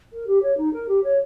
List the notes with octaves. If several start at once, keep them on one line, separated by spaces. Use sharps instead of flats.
A#4
G4
C#5
D#4
A#4
G4
C#5